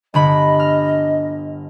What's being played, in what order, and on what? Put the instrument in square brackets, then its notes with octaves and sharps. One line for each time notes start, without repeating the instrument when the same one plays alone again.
[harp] G1 D3 B5 [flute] D#5
[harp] F6